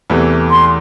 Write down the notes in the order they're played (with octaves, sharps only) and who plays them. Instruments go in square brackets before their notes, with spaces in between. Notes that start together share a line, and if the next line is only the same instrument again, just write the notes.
[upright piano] E2 C3 E3 A3
[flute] C6